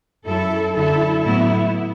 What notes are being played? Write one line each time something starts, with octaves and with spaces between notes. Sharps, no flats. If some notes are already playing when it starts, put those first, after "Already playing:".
F#2 F#3 E4 A4
F#2 D3 F#3 E4 A4
A2 F#3 B3 E4